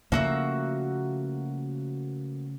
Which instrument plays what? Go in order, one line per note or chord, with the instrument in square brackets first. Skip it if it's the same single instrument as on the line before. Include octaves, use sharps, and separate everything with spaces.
[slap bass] C#3 F3 A3 [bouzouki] A#3 F#4 E5